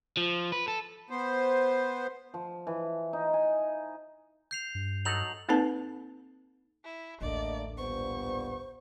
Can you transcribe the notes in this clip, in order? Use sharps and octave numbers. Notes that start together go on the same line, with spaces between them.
F3
B4
A4
B3 C5
F3
E3
D#4
G#5
G6 C7 F7
G2
F#3 D#4 A4 G6 F7 F#7
A#3 C4 D#4 A4 B4 A5
E4
A1 D2 A3 A#3 D4 D5 D#5
G2 A#2 B3 C5 C#6